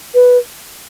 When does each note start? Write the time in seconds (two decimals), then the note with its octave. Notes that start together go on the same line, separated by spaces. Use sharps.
0.14 B4